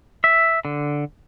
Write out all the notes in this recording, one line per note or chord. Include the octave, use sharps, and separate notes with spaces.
E5
D3